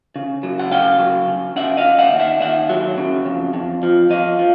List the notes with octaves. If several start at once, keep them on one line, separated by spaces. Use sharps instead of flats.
C#3
F#3
F#5
C#3 F5 G5
F#3
C#3
C#3 E5 F#5
D#5 F5
C#3
E5 F#5
D#2
E5 F#5
D#2 E5 F#5
F#3
C#3
F2
F2
F3
F3 D#5 F5
F3